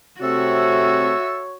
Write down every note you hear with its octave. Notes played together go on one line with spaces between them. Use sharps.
C3 A3 C4 F#4 A4 C#5 E5